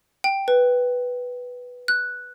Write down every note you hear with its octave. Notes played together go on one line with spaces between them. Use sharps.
G5
B4
F#6